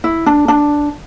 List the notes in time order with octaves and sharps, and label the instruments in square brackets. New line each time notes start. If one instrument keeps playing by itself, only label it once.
[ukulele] E4
D4
D4